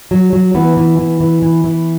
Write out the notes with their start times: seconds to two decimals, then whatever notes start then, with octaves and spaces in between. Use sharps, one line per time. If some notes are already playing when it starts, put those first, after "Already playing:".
0.11 F#3
0.33 F#3
0.55 E3 B3
0.77 E3
0.99 E3
1.20 E3
1.42 E3
1.64 E3